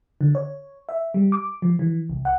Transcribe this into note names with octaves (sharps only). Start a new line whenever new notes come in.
D3
C#5
E5
G3
D6
F3
E3
C2
F#5